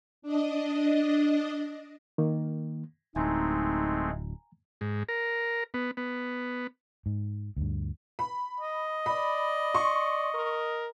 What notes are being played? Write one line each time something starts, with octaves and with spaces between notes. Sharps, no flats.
D4 D#5
D#3 A#3
D1 G#3 A3 C4 D#4 G#5 A#5
G#2
A#4
B3
B3
G#2
D2 G2
B5
D#5
D5 B5
C6 C#6
A#4